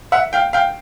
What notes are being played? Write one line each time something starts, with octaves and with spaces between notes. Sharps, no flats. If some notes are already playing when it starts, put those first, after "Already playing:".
E5 F#5
F5 G5
F5 G5